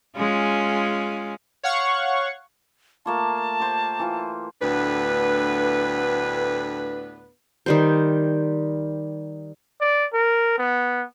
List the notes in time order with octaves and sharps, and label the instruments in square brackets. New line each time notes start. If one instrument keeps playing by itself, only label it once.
[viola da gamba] G#3 C#4 F4
[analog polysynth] C#5 F5 F#5 C#6
[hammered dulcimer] A3 A#3 F4 [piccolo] A5
[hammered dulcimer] G4 C5
E3 F4
[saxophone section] D2 A2 B3 D4 B4
[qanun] D#3 G3 C5
[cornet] D5
A#4
B3